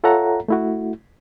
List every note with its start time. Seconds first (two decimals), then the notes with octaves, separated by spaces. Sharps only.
0.04 F4 A4 C#5 E5 F#5 A#5
0.48 A3 E4 F#4